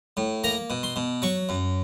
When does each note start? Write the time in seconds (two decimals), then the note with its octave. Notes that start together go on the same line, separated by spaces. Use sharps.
0.17 A2
0.44 A#3 A#5
0.70 B2
0.83 C6
0.96 B2
1.22 F#3 C#6
1.49 F#2